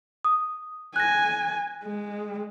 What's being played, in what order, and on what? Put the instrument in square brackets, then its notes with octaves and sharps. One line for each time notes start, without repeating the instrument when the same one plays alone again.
[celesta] D#6
[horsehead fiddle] G#5 [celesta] F#6 A#6
[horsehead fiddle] G#3